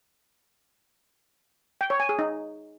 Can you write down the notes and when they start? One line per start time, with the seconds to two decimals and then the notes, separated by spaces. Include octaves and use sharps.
1.81 G5
1.90 C#5
2.00 G#5
2.09 G#4
2.19 D#4